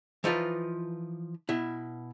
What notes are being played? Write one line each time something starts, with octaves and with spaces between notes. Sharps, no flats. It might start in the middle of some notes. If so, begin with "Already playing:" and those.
E3 F3 D#4 F4 B4
B2 E4